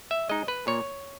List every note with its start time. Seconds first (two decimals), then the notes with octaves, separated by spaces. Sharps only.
0.11 E5
0.29 G#3 D#4 D#5
0.48 B4
0.67 A#2 C#5